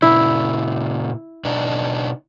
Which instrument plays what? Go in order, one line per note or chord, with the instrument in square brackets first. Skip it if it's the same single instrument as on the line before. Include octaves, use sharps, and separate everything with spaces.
[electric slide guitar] A#2 C#3 [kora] E4
[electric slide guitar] B2 D4 D#4